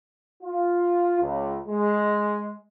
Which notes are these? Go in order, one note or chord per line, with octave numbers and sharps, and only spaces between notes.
F4
C#2
G#3